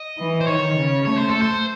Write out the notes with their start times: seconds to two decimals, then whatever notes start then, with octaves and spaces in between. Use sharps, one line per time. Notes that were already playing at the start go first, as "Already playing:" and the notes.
Already playing: D#5
0.18 E3
0.41 C5
0.47 D#3 C#5
0.77 C#3
1.06 A3 C#5
1.18 C5
1.29 A4
1.41 C5